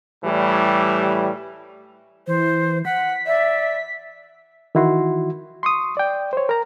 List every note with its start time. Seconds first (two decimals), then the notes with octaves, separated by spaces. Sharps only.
0.24 A2 E3 G3
2.27 E3 C5
2.85 F#5 B6
3.26 D5 E5
4.75 D#3 E3 E4 F#4 C6
5.63 C6 C#6 D#6
5.97 D5 G5
6.33 C5 C#5
6.49 A#4 A#5